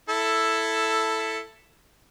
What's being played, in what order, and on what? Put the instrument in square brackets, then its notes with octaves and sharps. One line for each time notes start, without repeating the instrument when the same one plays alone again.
[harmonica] E4 A4